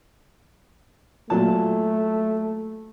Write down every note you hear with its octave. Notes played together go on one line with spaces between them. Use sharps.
A#2 F#3 A3 A5